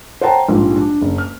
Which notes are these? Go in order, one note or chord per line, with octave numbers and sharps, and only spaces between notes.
C5 C#5 F#5 G5 A5 A#5
A#1 G#2 F3 G3
D4
F#1
F6